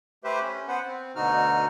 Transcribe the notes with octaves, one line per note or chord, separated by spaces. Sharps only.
A3 G4 B4 C5 E5
C#4
B3 B4 C5 F#5
C4
D2 B2 D3 D#4 F#4 F6